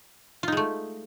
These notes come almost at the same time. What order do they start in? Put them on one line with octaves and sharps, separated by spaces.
F4 D#4 G#3 A3